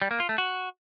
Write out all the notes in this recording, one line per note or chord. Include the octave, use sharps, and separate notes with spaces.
G3
A#3
F4
A3
F#4